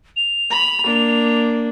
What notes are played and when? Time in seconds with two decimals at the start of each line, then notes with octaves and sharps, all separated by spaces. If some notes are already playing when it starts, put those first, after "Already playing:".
0.16 F7
0.50 B5
0.84 A#3 D4